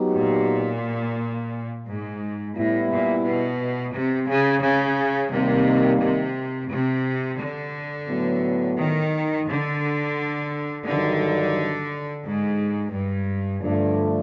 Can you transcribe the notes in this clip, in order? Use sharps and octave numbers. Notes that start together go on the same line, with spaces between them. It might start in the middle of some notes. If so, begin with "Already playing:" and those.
Already playing: F#3 B3 D#4 G4
A#2
G#2
A2 G3 B3 E4
A#2
B2
C3
C#3
C#3
D#2 C3 D#3 G3 A#3
C3
C3
D3
A2 F#3 B3
D#3
D3
G2 D3 D#3 F#3
G#2
G2
G2 D3 F3 A3 D4